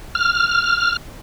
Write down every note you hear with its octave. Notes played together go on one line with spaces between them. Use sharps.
F6